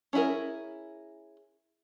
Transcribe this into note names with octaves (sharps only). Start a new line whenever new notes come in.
C#4 D4 E4 G#4 A#4